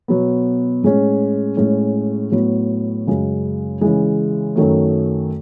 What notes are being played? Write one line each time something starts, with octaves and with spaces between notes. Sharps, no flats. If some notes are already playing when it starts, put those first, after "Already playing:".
B2 F#3 B3
A2 G#3 C#4
A2 G#3 C#4
A2 F#3 B3
F#2 C#3 G#3
C#3 E3 G#3
F#2 D#3 F#3 A3